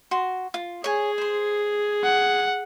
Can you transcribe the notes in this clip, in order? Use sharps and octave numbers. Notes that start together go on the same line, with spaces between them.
F#4 C6
F4
G#4 C#5 G#5
C5 C6
F#5